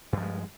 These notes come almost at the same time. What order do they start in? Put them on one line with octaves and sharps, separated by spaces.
G2 F3 G#3